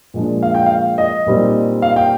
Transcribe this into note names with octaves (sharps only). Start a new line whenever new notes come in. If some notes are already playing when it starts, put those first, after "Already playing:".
A#2 F3 G#3 D4
F5
G5
F5
D#5
A#2 G3 C4 D#4
F5
G5